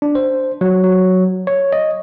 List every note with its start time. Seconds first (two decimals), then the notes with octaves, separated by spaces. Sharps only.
0.02 D4
0.15 C5
0.61 F#3
0.84 F#3
1.47 C#5
1.73 D#5